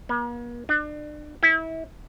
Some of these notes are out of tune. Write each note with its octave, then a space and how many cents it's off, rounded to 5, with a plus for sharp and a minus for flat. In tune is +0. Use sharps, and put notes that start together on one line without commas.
A#3 +45
D4 +35
E4 -30